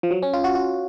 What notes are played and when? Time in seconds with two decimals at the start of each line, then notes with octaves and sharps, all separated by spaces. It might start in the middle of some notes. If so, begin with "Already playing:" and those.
0.03 F3
0.11 F#3
0.23 C#4
0.33 F4
0.44 F#4
0.55 F#4